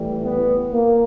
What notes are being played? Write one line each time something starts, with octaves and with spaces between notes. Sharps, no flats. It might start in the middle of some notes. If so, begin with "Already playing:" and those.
Already playing: A2 E3 G3
B3
A#3